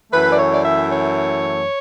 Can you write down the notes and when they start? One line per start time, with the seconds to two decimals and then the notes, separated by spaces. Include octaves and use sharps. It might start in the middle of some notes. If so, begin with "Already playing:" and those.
0.11 F#2 E3 A3 B4
0.32 D5
0.37 C#5
0.52 D5
0.64 E5
0.90 C#5